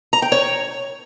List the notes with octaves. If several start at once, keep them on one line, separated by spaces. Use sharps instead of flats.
A#5
G5
C#5